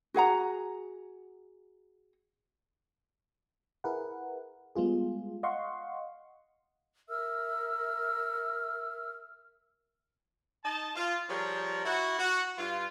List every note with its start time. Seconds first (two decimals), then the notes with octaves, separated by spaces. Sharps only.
0.14 F#4 G#4 F#5 A#5
3.84 E4 G#4 A#4 B4 F#5
4.75 G3 G#3 B3 F4 G#4
5.43 D#5 F5 F#5 C6 C#6
7.08 A#4 E5 E6 F6
10.64 D#4 D#5 A5
10.95 F4
11.28 F3 G3 G#4 A#4 C#5
11.85 E4 F#4
12.18 F#4
12.58 G2 F4